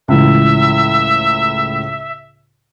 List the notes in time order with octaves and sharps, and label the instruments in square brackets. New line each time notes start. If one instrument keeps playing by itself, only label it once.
[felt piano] C#2 A2 E3 [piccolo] E5